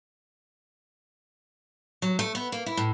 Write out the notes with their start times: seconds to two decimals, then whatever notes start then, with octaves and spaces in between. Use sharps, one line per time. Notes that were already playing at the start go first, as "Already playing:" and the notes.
2.02 F#3
2.19 A3
2.35 B3
2.52 A#3
2.66 E4
2.77 A2